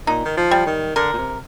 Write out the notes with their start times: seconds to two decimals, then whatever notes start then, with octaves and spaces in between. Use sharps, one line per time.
0.07 A#2 D#4
0.25 D#3
0.37 F3
0.51 G3
0.66 D#3
0.96 D3 A#4
1.13 A#2
1.18 C3